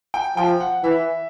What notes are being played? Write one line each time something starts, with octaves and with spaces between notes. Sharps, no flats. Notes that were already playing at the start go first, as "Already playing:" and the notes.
G5
F3 G5
F#5
E3 E5